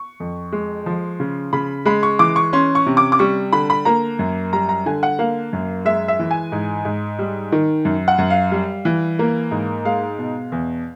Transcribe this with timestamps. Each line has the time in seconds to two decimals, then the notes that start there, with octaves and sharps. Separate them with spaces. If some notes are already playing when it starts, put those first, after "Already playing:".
Already playing: C#6
0.20 F2
0.52 G#3
0.86 F3
1.20 C#3
1.53 C#3 B5
1.85 G#3 B5
2.03 C#6
2.19 E3 D6
2.36 C#6
2.53 C#4 C6
2.75 C#6
2.86 C3
2.97 D6
3.12 D6
3.19 G3 C#6
3.53 D3 B5
3.70 B5
3.85 A#3 A#5
4.19 F#2
4.53 G3 A#5
4.69 A#5
4.86 D3 G#5
5.03 F#5
5.19 A#3 F5
5.53 F#2
5.85 G#3 E5
6.08 E5
6.19 E3
6.31 G#5
6.52 G#2
6.85 G#2
7.19 G3
7.52 D#3
7.85 F#2
8.08 F#5
8.18 F#2
8.30 F5
8.52 G3
8.85 E3
9.19 A#3
9.51 G#2
9.85 G#3 F5
10.18 B2
10.52 E2